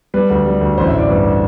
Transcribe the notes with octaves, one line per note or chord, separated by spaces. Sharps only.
G3 B4
D2
G3
D2
A1 C5
E5
A1
D5
G2 B4